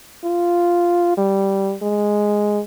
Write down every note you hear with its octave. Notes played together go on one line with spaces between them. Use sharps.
F4
G3
G#3